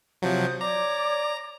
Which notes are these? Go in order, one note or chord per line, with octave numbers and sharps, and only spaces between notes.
C3 F3 F#3 D#6 G6
C#5 D5 A#5 D6